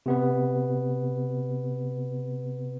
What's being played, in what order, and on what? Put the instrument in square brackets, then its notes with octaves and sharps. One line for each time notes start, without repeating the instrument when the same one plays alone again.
[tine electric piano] C3 B3 B4